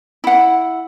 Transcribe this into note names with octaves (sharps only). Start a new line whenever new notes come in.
E4 F#5